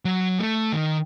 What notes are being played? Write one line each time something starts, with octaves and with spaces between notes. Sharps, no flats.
F#3
A3
D#3